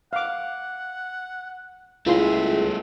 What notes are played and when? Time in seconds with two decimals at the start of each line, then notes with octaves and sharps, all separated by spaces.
0.13 F5 F#5 D6
2.06 C#2 A3 E4 F4 G#4 E5 C6